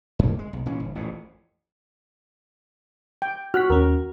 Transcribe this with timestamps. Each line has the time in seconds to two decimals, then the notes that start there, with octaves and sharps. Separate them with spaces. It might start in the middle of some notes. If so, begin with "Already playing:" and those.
0.19 F#2 A#3
0.39 G#3
0.53 B1
0.66 A#2 E3 C#4
0.80 G1
0.95 A1 F2 A#2
3.22 G5
3.54 F#4 F6 F#6 B6
3.70 D#2 C#4 A#4